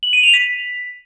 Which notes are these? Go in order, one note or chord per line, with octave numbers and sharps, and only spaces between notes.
F#7
D#7
F7
B6